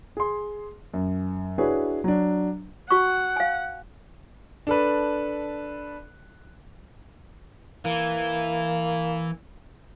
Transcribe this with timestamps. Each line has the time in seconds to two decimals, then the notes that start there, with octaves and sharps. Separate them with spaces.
0.17 G#4 C6
0.94 F#2
1.58 D4 E4 F#4 G#4 B4 C#5
2.04 F#3 D4
2.91 F#4 F#5 C#6
3.36 F5 G#5
4.67 D4 A4 B4
7.85 E3 A#3